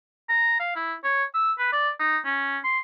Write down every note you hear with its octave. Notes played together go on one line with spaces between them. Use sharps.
A#5
F5
E4
C#5
E6
B4
D5
D#4
C#4
C6